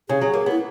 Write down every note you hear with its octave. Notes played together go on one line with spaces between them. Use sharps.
C#3 G#4
F#3
A#3
B3
E4